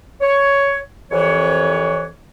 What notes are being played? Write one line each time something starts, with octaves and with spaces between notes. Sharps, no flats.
C#5
C2 F2 E3 C#5